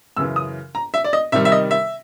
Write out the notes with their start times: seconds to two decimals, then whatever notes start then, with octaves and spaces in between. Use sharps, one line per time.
0.17 F#2 C#3 E3 E6
0.36 D#6
0.75 A#5
0.94 E5
1.04 D5
1.13 D#5
1.32 C3 D#3 G3 E5
1.45 E5
1.52 D#5
1.71 E5